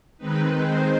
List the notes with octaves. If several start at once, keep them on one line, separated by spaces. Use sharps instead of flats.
D#3 G#3 C4 D#4 B4
C5